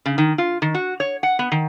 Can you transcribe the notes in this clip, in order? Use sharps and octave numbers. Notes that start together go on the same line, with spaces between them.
C#3
D#3
F4
D#3
F#4
C#5
F#5
B3
D#3